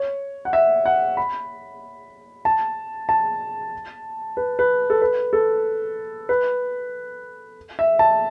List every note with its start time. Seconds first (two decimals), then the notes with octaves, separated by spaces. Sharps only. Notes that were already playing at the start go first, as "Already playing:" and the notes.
Already playing: C#5
0.45 F#5
0.53 E5
0.86 F#5
1.17 B5
2.45 A5
3.09 A5
4.37 B4
4.59 B4
4.90 A4
5.02 B4
5.33 A4
6.29 B4
7.79 E5
7.99 A5